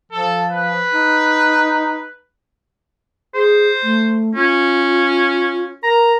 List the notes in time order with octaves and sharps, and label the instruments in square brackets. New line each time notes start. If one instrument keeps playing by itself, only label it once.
[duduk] F3 [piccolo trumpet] A4
[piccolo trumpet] B4
[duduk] D#4
[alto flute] G#4 [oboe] C5
[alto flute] A3
[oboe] C#4 [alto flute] F4
[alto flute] A#4 [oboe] A#5